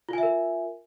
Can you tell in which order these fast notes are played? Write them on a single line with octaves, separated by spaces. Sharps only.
F4 G#5 E5 A#4